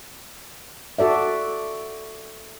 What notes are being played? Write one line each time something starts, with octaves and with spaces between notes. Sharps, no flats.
F#4 A4 D5 E5